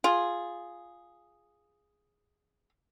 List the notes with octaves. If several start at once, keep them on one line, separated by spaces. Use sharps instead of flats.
F4 G#4